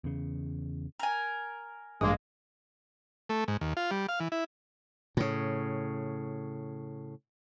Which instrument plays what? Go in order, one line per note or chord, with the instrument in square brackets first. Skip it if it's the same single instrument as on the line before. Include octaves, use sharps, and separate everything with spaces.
[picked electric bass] E2 C#3
[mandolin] A#4 G#5
[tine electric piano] A1 G2 D#6 [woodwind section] G#3 A#3
[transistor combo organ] A3
G#2
D#2
F4
G3
F5
E3
E4
[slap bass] A2 C#3